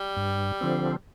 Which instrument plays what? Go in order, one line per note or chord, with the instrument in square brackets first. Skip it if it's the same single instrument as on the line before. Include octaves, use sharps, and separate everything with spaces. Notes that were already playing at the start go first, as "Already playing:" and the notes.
Already playing: [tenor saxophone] G3
[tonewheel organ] G2
D3 F3 C4